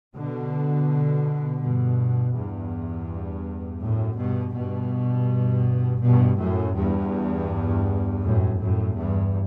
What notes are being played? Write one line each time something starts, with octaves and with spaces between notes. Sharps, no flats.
B2 D3
G2 B2
E2 G2
F#2 A2
G2 B2
G2 B2
G2 B2
F#2 A2
E2 G2
F#2 A2
F#2 A2
E2 G2